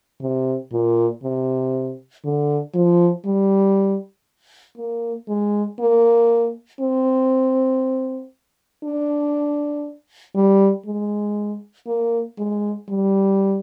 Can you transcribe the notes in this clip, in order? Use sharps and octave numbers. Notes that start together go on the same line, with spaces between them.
C3
A#2
C3
D3
F3
G3
A#3
G#3
A#3
C4
D4
G3
G#3
A#3
G#3
G3